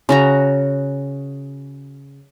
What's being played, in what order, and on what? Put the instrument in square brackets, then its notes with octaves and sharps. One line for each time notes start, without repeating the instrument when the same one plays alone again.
[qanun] C#3 F#4 A#5